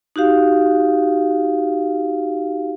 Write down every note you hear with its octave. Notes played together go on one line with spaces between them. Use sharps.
D#4 F#4 G4 F5